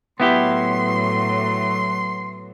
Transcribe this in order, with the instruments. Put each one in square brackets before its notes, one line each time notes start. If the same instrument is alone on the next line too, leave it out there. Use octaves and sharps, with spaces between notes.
[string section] A2 F#3 [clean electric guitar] B3 E4 G4 [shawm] C6